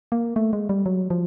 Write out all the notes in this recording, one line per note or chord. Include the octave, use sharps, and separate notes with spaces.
A#3
A3
G#3
G3
F#3
F3